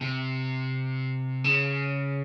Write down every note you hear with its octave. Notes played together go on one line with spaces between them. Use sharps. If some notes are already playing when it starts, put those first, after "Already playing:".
C3
C#3